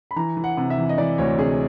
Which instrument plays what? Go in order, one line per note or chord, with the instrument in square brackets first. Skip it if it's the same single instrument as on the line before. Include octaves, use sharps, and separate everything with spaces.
[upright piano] B5
E3 A#5
E3
F#5
C3
E5
E3
D#5
E3 D5
D2 C#5
C3 G#4